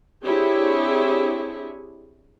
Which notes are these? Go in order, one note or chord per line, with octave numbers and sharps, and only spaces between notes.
C4 D4 E4 G4 G#4 C#5